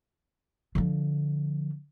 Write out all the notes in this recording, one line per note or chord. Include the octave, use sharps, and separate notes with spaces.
D3 F3